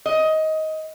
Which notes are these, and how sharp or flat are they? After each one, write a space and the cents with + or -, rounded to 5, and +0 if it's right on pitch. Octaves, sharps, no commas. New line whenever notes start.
D#5 +15